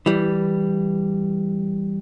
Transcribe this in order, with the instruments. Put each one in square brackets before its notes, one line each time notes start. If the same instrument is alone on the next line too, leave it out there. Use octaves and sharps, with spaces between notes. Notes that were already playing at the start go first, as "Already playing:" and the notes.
[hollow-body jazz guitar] E3 G3